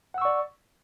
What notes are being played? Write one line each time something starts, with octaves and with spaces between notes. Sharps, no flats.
D5 F#5 C#6 E6